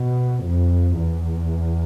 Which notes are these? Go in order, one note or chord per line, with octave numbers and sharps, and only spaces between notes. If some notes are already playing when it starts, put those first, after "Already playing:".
Already playing: B2
F2
E2